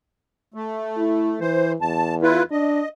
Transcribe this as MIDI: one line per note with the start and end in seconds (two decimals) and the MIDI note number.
0.54 1.40 57
0.97 1.34 64
1.40 1.75 52
1.40 1.72 72
1.81 2.39 40
1.81 2.15 81
2.22 2.43 64
2.22 2.43 65
2.22 2.43 71
2.51 2.82 62
2.51 2.88 75